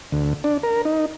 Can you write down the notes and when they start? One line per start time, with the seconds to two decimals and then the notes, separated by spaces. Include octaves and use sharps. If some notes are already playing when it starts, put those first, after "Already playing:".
0.12 D2
0.44 D4
0.63 A#4
0.85 D#4